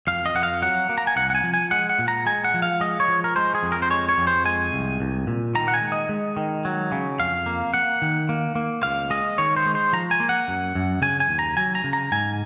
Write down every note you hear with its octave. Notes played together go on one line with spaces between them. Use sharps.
F2 F5
D#5
F2 F#5
F5
F#3 F#5
A#3
A#5
G#5
C2 F#5
F#5
G#5
F3
G#5
G#3 F#5
F#5
A#2
A#5
G#3 G#5
F#5
F3
F5
G#3 D#5
C#5
F3
A#4
G#3 C5
G#4
F2
A#4
C5
G#3 C#5
C#5
F2
C5
G#3 G#5
C2
C2
A#2
D#3 A#5
F#5
G#5
G#3
D#5
G#3
D#3
F#3
C#3
F2 F5
A#3
A#3 F#5
D#3
A#3
A#3
C#2 F5
G#3 D#5
D#3 C#5
C5
G#3
C5
F3 A#5
G#5
A#3
F#5
F#2
F#2
C#3 G#5
G#5
D#2
A#5
F#3 G#5
A#5
C#3
A#5
G#2 G#5